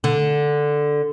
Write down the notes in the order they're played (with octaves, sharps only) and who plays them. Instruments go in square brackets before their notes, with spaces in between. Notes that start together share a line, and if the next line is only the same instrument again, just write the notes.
[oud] D3